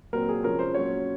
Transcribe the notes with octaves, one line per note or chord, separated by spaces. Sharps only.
A#2 F#3 C4 A#4
G#4
C3 F3 G#3 C#4 A#4
C5
A#2 F#3 C#4 C#5